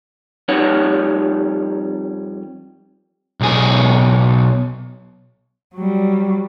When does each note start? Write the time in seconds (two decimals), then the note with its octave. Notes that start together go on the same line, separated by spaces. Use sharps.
0.48 F2 G3 D#4 C#5 F#5
3.41 B1 G#4
5.75 F#3 G3